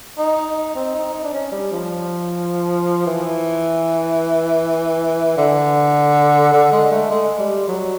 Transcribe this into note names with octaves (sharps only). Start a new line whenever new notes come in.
D#4
C4
D#4
D#4
D4
C#4
G3
F3
E3
D3
D3
G#3
A3
G#3
G3
F#3